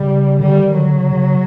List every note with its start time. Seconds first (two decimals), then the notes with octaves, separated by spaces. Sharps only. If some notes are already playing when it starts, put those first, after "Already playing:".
Already playing: C#3 G3
0.40 D3 G3
0.58 D#3
0.77 D3 F#3
0.94 C#3
1.13 C#3